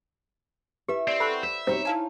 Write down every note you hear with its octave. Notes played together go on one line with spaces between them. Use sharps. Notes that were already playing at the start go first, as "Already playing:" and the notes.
E4 G4 B4 E5
C4 D5
A4 F#5 B5 C#6
C5 E5
B2 G3 C4 D#4 C5 C#5
E4 F5 G#5 A5